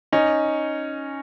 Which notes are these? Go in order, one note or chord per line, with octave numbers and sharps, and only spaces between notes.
C#4 D#4